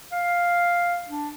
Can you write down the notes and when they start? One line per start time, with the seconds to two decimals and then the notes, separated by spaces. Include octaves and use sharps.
0.12 F5
1.08 D4